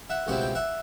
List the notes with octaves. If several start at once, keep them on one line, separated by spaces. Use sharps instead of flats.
E5 F#5
C#2 B2 G3 C4 E4 F#5
G5
E5 F#5